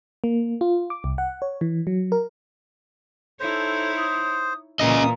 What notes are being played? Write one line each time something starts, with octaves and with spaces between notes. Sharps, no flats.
A#3
F4
D6
C2
F#5
C#5
E3
F#3
A#4
D#4 E4 A4 C5 C#5
D#6
A#2 E3 A#3 C#4 D#5 A#5 D#6